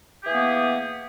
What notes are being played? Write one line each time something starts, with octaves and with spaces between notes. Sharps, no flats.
E3 A#3 B3 G4 G#4